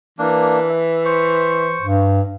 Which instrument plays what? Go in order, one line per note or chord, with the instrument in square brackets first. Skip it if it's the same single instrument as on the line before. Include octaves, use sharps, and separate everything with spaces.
[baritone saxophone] E3 [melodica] A#3 D4
[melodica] E5
C5 C#6
[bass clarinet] G2